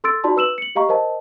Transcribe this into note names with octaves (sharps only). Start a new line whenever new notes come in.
A4 C6 E6 A6 D7
D#4 F4 F#4 D5 A5 C6
B4 E6 E7 F#7
C#7 F#7
G4 D#5 F5 A#5 C#6
A#4 C5 D#5 A5